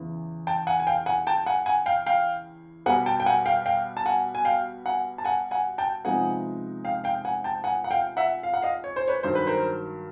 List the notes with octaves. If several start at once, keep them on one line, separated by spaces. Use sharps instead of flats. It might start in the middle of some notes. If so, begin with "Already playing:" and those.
Already playing: E2 C#3 E3
G5 A5
F#5 G#5
G#5
F5 G5
F#5 G#5
G5 A5
F#5 G#5
F#5 G#5
F5 G5
F5 G5
B2 G3 B3 F#5 G#5
G5 A5
G5
F#5 G#5
F5 G5
F5 G5
A5
F#5 G#5
G#5
F5 G5
F#5 G#5
A5
F#5 G#5
F#5 G#5
G5 A5
C3 F3 G#3 B3 D#4 F#5 G#5
F5 G5
F5 G5
F#5 G#5
G5 A5
F#5 G#5
F#5
F5 G5
E5 F#5
F5
F#5
D#5 F5
C#5
C5
B4 C#5
G2 D#3 F#3 C5
B4
A#4 C5